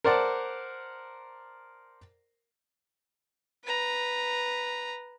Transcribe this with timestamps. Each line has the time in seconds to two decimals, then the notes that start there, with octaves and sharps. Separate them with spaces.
0.04 A#4 C5 D5 F#5 A5
3.65 B4 A#5